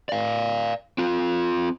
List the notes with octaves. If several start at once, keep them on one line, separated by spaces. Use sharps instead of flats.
D5 F5
C4 F4